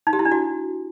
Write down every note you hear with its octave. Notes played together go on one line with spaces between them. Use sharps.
D#4
G4
E4
D4
F#4